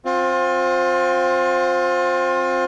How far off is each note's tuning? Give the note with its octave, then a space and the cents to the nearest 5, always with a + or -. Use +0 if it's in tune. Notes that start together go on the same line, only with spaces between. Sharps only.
C4 +10 F4 +30